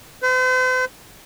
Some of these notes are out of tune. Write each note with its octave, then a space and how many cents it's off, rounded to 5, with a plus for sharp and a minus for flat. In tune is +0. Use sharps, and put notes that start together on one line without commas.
C5 -45